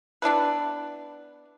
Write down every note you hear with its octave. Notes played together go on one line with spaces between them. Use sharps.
B3 D4 E4 B4